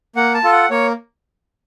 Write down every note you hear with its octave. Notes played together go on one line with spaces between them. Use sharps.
A#3 F#5
A5
F4 A4
F#5
A#3 C#5